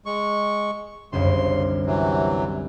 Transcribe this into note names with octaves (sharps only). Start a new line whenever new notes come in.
G#3 C#6
G1 C2 F#2 C#3 C6
C3 E3 F#3